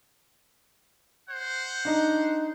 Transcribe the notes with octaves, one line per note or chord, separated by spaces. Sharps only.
C5 F#5
D4 D#4